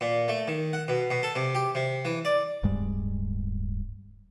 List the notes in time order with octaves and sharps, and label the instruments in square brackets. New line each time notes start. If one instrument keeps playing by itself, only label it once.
[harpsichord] A#2
A3
D#3
F#5
B2
B2
A4
C3
G4
C3
E3
D5
[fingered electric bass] D1 G2 G3 G#3